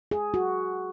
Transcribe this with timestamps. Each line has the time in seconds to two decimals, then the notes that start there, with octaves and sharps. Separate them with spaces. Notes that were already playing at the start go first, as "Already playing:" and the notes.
0.11 G#4
0.34 F#4